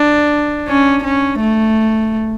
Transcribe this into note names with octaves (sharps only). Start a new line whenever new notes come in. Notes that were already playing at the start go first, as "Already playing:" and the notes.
Already playing: D4
C#4
C#4
A3